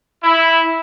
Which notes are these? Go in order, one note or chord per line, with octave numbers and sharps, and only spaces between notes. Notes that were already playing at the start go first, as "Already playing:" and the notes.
E4